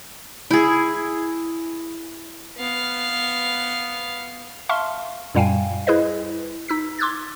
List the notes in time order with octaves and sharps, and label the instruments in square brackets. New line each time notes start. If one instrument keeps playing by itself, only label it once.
[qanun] E4 G#4
[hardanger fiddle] B3 F5
[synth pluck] E5 F5 A5 C6 C#6 F6
F#2 A#2 G3 F5 G5 G#5
E4 G#4 B4 C5 D#5
D#4 E6 B6
C6 D6 E6 F#6 G#6 A6